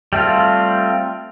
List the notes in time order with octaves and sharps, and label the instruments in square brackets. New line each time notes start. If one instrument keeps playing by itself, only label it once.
[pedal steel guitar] G3 A3 C4 F4